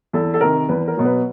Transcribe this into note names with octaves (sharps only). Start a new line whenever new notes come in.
E2 A4
A4
C3 D#3 A#4
E2 B4
A#4
B2 F#3
B4